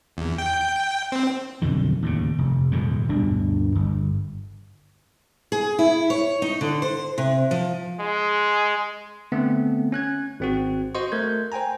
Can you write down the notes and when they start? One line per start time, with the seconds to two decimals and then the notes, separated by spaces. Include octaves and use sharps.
0.17 E2
0.38 G5
1.12 C4
1.62 B1 F2 D3 D#3
2.03 D#2 A2 C#3
2.38 F1
2.71 D#1 F2 G#2
3.09 D1 G2 B2 D4
3.75 G1
5.52 G#4
5.79 E4
6.10 C#5
6.42 D#4
6.61 D3
6.82 C5
7.18 C3
7.51 F3
8.00 G#3
9.32 D3 A3 B3 C4
9.92 C#4 F#6 G#6
10.40 G#1 C4 F#4
10.95 F#4 C5 D#5 C6 C#6
11.12 A3 A#4 G6 G#6
11.52 C5 G5 G#5 A#5